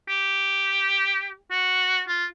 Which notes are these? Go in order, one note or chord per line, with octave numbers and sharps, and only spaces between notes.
G4
F#4
F4